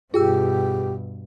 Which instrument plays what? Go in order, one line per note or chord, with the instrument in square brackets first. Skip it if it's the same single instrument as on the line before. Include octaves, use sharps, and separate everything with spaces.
[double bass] G2 B2 [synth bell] F4 G5 E6 [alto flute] G4 [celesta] G#4